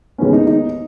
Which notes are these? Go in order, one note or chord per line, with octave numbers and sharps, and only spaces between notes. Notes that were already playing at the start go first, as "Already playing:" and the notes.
D#2 D#3 G#3 B3 C#4
D#4
D#4